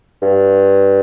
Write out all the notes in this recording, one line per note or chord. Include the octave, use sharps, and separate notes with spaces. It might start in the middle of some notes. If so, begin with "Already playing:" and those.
G2